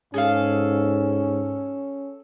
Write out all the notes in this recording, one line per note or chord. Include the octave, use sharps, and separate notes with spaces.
G#2 C#4 G#4 A4 F5